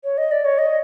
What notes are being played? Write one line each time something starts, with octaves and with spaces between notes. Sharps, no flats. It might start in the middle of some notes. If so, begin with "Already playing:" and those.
C#5
D#5
D5
C#5
D#5